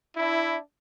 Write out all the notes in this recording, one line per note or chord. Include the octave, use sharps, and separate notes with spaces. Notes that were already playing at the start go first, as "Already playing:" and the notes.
D4 E4